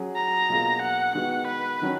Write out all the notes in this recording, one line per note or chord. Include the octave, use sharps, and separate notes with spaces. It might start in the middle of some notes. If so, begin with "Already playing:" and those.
Already playing: F#3 C#4 G#4
A#5
B2 F#3 A#3 F4 G#4
F#5
D#3 G#3 B3 F#4 F#5
B4
D#3 F#3 C#4